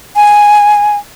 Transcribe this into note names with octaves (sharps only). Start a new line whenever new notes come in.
G#5